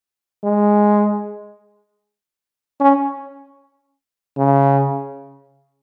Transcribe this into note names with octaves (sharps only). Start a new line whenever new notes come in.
G#3
C#4
C#3